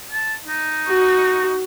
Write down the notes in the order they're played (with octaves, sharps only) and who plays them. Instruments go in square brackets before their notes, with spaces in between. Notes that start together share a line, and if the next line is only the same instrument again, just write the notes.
[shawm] A5
D#4
[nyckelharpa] F#4